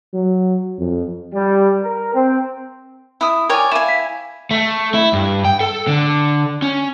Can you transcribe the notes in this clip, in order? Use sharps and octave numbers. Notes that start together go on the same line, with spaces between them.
F#3
F2
G3
A#4
C4
E4 D#6
A#4 C#5 D5 G5 G#5
E4 F5 G#5 D#7 E7
B6
A3
E4
G2
G5
A4
D3
C#4